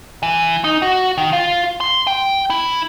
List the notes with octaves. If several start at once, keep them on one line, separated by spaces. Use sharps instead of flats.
E3
D#4
F#4
D#3
F4
C6
G5
E4